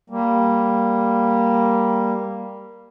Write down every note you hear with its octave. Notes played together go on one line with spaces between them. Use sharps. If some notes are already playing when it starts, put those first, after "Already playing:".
G3 A#3